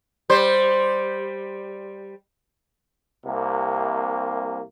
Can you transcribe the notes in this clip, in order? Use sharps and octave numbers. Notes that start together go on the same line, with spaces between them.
G3 C5
C2 C3 A#3